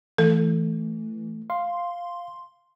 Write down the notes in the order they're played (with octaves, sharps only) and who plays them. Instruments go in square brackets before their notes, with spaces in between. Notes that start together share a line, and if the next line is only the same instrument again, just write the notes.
[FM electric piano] E3 [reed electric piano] A3 [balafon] A4
[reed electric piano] F5 [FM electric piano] C6